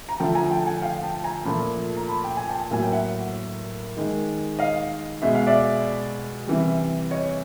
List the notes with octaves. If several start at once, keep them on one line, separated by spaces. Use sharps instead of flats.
A#5
D3 F3 A3 G5 A5
G#5 A#5
G5 A5
F#5 G#5
F5 G5
G5 A5
G#5 A#5
A#2 F3 A3 A5 B5
A#5
A5 B5
G5
G#5
G5 A5
A2 F#3 A#3 G#5
G5
E5 F#5
D#3 G#3
D#5 F5
B2 G#3 E5
F5
D5 E5
C3 E3 G3
C#5 D#5